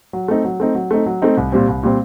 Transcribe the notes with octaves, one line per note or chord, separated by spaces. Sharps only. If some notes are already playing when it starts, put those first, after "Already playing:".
F#3
A3 C4 D#4
F#3
A3 C4 D#4
F#3
A3 C4 D#4
F#3
A3 C4 D#4
C2
A#2 G3 C4
C2
A#2 G3 C4